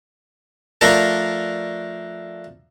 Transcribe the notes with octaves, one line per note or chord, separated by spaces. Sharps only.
F3 A3 D4 A#4